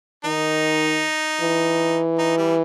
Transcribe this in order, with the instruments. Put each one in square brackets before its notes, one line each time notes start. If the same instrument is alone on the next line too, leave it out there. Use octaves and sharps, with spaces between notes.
[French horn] D#3 [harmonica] D#4
[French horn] E3
[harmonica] D#4
G3